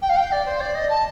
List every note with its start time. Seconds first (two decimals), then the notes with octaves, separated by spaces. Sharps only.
0.02 G5
0.09 F5
0.17 G5
0.32 D5
0.46 C5
0.61 D5
0.75 D#5
0.89 A5